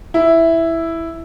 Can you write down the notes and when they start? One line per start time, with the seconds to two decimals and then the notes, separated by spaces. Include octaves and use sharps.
0.14 E4